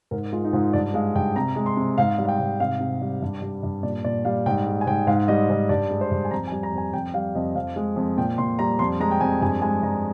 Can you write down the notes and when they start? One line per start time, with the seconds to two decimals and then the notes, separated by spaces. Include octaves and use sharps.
0.11 G#2 A#4
0.33 G#3 F4
0.44 D#4
0.53 G#2 F4
0.73 G2 D5
0.94 G#3 F5
1.15 G2 G5
1.36 C3 A#5
1.56 G#3
1.66 C6
1.77 C3
1.98 G#2 F5
2.18 G3
2.25 F5
2.29 G5
2.39 G#2
2.60 C3 F5
2.81 C3
3.01 G3
3.22 G2
3.42 G3
3.63 G2
3.83 A#2 D5
4.04 A#2 D5
4.25 G3 F5
4.46 G#2 G5
4.67 G#3
4.81 G#5
4.87 G#2 G5
5.07 G#2 F5
5.28 G3 D#5
5.50 G#2
5.69 G2 D5
5.91 G#3
6.01 C5
6.11 G2
6.25 G#5
6.31 F2 A#5
6.47 G#5
6.52 G3
6.63 A#5
6.73 F2 G#5
6.93 F2 G5
7.14 G3 F5
7.35 F2 D#5
7.55 F2 F5
7.76 G#3
7.96 F2
8.17 A#2 G5
8.38 A#2 C6
8.59 G3 A#5
8.79 F2 C6
9.00 G#3 A#5
9.11 G5
9.21 F2 G#5
9.42 G2 G#5
9.62 G#3 G#5
9.82 G2 A#5